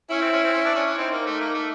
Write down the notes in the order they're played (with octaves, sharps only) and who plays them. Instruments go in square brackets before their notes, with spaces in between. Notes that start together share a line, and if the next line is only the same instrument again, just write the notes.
[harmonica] C#4 [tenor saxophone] E4
[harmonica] C4
C#4
C4
C#4
D4
C#4
C#4
[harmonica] C4 [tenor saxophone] D#4
[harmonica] A#3
A3
A#3
A3